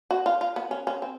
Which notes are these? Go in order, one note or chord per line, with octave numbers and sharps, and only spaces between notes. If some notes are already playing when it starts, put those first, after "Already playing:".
F#4
F4
F4
B3
C#4
C#4
C4